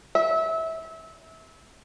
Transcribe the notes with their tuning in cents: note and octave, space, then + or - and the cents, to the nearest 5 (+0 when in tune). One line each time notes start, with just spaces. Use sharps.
E5 -25